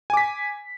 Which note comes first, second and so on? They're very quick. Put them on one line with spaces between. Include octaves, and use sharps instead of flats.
G#5 D6 B6